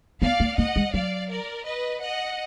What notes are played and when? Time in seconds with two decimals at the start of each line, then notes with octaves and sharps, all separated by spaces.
0.22 B3 D5 F5
0.40 A#3
0.58 A#3 D#5 F#5
0.76 G#3
0.93 F#3 D5 F5
1.30 A#4 D5
1.66 B4 D#5
2.01 D#5 F#5